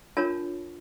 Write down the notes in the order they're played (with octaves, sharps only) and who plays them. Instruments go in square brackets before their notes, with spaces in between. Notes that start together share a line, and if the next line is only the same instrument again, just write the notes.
[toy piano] D4 F4 A#4 C#5 A5